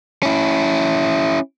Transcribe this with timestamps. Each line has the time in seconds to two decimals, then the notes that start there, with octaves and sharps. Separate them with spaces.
0.23 C#4 E4